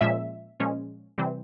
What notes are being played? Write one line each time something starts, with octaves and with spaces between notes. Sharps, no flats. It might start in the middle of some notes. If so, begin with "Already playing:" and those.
A#2 F3 G#3 C#4 E5
A#2 F3 G#3 C#4
C3 E3 G3 C4